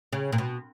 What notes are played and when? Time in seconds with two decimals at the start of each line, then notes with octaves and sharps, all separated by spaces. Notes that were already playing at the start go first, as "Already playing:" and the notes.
0.13 C#3
0.32 A#2
0.38 B2